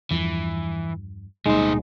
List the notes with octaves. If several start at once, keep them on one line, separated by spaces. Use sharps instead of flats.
E2 G2 E3 F3
D1 B2 G3 G#3 A#3 D#4 C5